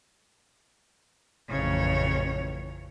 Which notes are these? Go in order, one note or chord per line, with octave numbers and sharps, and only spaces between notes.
A1 F2 C#3 C#5